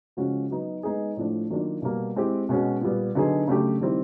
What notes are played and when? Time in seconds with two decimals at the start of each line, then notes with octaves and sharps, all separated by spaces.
0.17 C#3 F3 G#3 C#4 F#4
0.51 F#3 B3 D#4
0.83 G#3 B3 D#4 G#4
1.17 A2 F3 A3 D4
1.50 D#3 F#3 A#3 D4 F4
1.82 B2 G3 A#3
2.16 G#3 C4 E4 G4
2.49 B2 G#3 C#4 F#4
2.81 A#2 G3 B3
3.15 D3 F#3 B3 D#4 G#4
3.47 C#3 F#3 A3 D4 G4
3.81 D#3 G3 C4 E4 G4